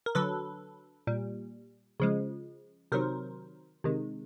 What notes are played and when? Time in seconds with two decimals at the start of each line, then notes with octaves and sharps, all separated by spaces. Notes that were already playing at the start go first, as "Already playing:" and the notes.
0.06 A#4
0.15 D3 F#3 A4 B4
1.07 A#2 G3
2.00 C#3 F3 G#3
2.92 C3 D#3 F#3 A#4 C5
3.84 C3 D#3 G#3